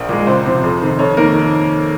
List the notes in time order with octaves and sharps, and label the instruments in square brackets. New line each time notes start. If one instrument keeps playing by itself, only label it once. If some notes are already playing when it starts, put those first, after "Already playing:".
Already playing: [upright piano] A#1 A#4
A#2 G#3
C#2 C5
C3 F3
F2
C3 D#3
F2 C#5
D#3 A#3 A#4